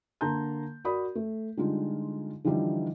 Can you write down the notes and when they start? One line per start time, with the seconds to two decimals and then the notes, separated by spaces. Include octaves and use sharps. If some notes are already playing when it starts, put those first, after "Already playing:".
0.21 D3 A#3 A5 A#5 C6 G6
0.84 F#4 A#4 D5 B5 D#6
1.15 A3
1.57 D3 G3 G#3 D#4 F4
2.44 D3 E3 F3 G3 D#4 E4